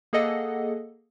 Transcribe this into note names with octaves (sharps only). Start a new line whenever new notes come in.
A#3 G#4 A4 D#5 F#5